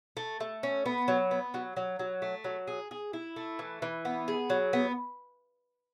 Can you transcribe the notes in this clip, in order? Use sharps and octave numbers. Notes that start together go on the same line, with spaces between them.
A3
A3
C#4
B3
F#3
B3
F#3
F#3
F#3
A3
F#3
G#4
G#4
E4
A3
E3
E3
B3
G#4
F#3
B3